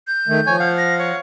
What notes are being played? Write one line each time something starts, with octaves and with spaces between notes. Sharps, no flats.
G6
D#3 A3
F3 C#5 G#5
F5 F#5
A#6
C#5